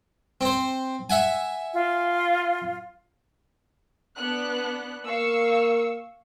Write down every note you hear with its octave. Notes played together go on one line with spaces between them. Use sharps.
C4 C5
E5 F#5 G#5
F4
B3 D4 F#6
A#3 F5 C#6 E6